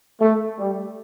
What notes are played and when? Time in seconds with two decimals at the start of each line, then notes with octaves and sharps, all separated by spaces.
0.21 A3
0.59 G3